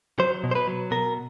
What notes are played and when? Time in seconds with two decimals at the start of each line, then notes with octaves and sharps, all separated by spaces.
0.19 F#3 C5
0.44 B2
0.51 C5
0.55 B4
0.68 F#3
0.91 B2 A#4